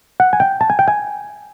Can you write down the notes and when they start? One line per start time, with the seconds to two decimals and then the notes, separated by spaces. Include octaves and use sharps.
0.20 F#5
0.33 G#5
0.40 G5
0.61 A5
0.70 G#5
0.79 G5
0.88 G#5